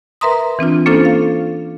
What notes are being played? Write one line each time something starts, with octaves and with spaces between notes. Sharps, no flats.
A#4 B4 E5 A#5 C6 D#6
E3 C4 D4 F4
A#3 C#4 D4 F4 A4 C5
F5